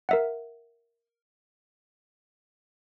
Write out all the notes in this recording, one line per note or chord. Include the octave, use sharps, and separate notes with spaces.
A#4 E5 F#5